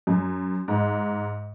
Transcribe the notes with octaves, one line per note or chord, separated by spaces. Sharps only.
F#2
G#2